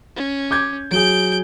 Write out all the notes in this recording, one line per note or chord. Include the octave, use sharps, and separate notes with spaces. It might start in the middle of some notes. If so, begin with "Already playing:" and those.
C#4
D6 G6 G#6
F#3 G#4 G6 D7